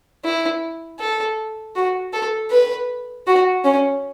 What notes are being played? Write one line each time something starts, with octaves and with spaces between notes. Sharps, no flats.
E4
A4
F#4
A4
B4
F#4
C#4